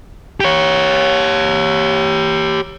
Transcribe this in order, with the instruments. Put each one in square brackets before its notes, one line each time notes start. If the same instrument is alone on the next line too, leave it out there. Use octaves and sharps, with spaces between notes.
[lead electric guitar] G4 C#5